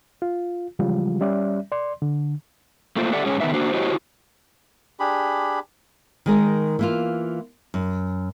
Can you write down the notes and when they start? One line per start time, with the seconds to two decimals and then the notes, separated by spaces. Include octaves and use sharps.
0.22 F4
0.79 C#3 E3 F3 G3 G#3 F4
1.21 G3 C#4 D5 E5
1.72 D5 C6
2.02 D3
2.96 A3 A#3 F4 C5
3.13 G4 A4 D5 E5 F#5
3.26 G#2 G#3 C#4 G#4 C#5
3.40 C3 D#3 B3 D#4 B4 E5
3.53 A#3 D4 F#4 C5
3.74 E4 F#4 G4 C5 C#5 D#5
5.00 D4 G4 G#4 B5
6.26 D#3 G#3 A#4
6.79 E3 A#3 F4
7.74 F#2